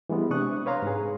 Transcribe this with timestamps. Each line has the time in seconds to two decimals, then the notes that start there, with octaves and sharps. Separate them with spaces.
0.09 E3 G3 G#3 B3
0.30 C3 D4 C#6 D#6 F#6
0.66 B4 C#5 F5 A#5 C6
0.82 G#2 G#4